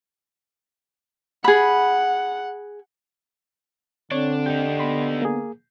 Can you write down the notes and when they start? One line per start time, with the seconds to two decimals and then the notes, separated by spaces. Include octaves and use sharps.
1.44 G#4 F#5 B5
4.12 D3 C4 D4 C#5
4.46 D#4 G4 G6
4.79 B3 B5 C6
5.22 A#3 G#4